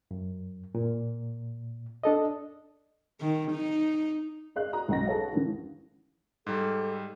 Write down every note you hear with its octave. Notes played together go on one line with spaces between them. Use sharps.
F#2
A#2
D4 A4 D#5
D#3
D#4
G#4 D5 D#5 F5 F#6
F#4 A#5 D#6
B1 C#4 D#5 F#5 A#5 A#6
G#4 A4 B4 C#5 F5 F#5
D#2 C#3 E3
G#2 G3 A4